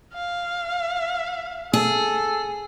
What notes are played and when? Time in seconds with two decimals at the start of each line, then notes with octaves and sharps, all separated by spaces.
0.14 F5
1.73 G#4 A4